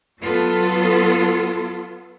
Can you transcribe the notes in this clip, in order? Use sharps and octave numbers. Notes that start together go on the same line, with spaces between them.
F#3 B3 F4 A4